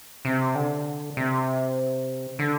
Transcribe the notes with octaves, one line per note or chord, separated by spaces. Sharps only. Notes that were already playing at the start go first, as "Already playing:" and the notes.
C3
D3
C3
D3